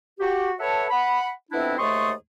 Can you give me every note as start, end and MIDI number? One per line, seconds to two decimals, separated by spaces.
0.20 0.52 66
0.20 0.52 67
0.59 0.87 69
0.59 0.87 71
0.59 0.87 73
0.59 0.87 76
0.59 0.87 78
0.59 0.87 81
0.90 1.30 78
0.90 1.30 83
1.51 1.75 41
1.51 1.75 59
1.51 1.75 60
1.51 1.75 62
1.51 1.75 64
1.78 2.11 39
1.78 2.11 44
1.78 2.11 57
1.78 2.11 84
1.78 2.11 85
1.78 2.11 87